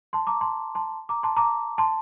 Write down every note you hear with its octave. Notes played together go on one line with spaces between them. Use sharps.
A5 C6
A#5 D6
A5 C6
A5 C6
A#5 D6
A5 C6
A#5 D6
A5 C6